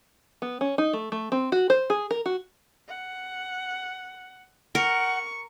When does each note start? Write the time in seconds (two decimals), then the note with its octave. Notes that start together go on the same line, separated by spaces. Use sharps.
0.42 B3
0.61 C#4
0.78 D#4
0.93 A3
1.12 A3
1.32 C4
1.52 F#4
1.70 C5
1.90 G#4
2.11 A#4
2.26 F#4
2.88 F#5
4.75 A#4 F#5 C#6